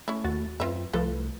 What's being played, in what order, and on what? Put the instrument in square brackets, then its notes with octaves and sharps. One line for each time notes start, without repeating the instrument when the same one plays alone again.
[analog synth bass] A3 [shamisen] C#4 E4
[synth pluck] D#2 F#4 A6
[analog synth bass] F#2 [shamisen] C4 E5 [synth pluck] F4 B4
[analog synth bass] C2 [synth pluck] F3 A3 B4 [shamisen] F4 A4